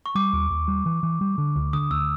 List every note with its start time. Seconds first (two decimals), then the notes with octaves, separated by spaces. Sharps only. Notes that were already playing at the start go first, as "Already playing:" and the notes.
0.06 C#6
0.15 G3 D6
0.33 D#2
0.50 D#2
0.68 G3
0.86 E3
1.03 E3
1.21 G3
1.38 D3
1.56 D2
1.73 D3 D#6
1.91 D2 E6